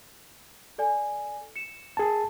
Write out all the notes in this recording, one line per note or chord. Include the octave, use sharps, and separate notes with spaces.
A4 D5 G#5
C#7 E7
G#4 A5